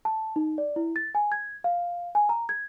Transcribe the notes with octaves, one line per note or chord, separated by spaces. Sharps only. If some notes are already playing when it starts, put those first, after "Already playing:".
A5
D#4
D5
E4
A6
G#5
G#6
F5
G#5
A#5
G#6